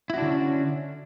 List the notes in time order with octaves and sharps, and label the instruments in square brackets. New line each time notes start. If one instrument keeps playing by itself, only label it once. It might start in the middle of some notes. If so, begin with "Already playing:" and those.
[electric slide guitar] E4
F#4
D4
D3
C#4